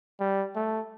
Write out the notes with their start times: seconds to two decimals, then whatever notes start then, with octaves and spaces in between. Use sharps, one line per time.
0.20 G3
0.56 A3